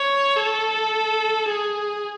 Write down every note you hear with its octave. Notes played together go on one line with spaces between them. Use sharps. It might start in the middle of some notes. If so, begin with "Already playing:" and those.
Already playing: C#5
A4
G#4